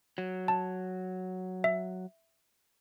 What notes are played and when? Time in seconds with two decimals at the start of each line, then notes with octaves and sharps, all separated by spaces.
0.18 F#3
0.48 A5
1.64 E5